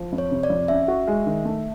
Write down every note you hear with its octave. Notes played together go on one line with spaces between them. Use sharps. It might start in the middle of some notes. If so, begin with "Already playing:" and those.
Already playing: F3
F2
C#5
C3
D5
F2
C#4 E5
F#4
G#3
D#3
A3